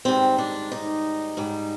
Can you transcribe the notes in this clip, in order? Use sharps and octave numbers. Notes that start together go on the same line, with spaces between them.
G#2 D#3 G3 C4
D4
D#4
G#2 G3